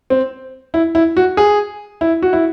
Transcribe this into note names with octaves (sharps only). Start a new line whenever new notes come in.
C4
E4
E4
F#4
G#4
E4
F#4
E4